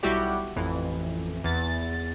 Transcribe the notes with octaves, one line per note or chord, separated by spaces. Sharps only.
B1 G3 E4 F#4 G4 D5
A1 F2 E3
E2 A6